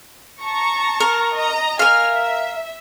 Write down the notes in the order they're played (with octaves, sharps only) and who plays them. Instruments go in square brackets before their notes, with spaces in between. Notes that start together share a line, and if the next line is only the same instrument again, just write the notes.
[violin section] A5 A#5 C#6
[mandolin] A#4
[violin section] D#5 A#5
[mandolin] A#4 F5 [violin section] G#5 F6
[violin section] E5